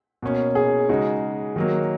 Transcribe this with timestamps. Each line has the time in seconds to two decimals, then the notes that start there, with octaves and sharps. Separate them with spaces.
0.22 B2 A#3 C#4
0.55 G#4
0.89 C#3 G#3 D#4 F#4
1.56 D#3 F#3 A#3